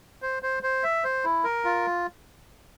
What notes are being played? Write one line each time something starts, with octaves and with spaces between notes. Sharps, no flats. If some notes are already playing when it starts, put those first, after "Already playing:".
C5
C5
C5
E5
C5
E4
A#4
F4